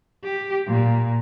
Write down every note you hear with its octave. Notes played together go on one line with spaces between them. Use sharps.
G4
A#2